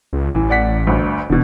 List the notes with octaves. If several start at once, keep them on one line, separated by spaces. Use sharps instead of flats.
C#2
A1 E3
D5 F#5 B6
G1 D2
E1 B2 D3